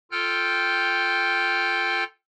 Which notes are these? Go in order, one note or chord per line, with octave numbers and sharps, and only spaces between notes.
F4 A4 G5 F6 G6